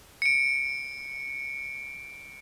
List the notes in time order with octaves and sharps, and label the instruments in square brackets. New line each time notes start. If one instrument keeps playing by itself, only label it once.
[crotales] C#7 D7